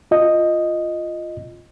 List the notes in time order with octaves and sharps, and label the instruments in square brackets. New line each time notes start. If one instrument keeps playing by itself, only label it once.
[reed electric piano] F4 D#5